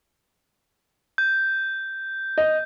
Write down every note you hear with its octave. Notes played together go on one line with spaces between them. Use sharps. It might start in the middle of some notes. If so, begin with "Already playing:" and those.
G6
D#5